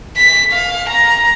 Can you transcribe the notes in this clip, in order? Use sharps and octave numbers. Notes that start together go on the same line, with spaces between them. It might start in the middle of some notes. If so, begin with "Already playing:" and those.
B6
F5
A#5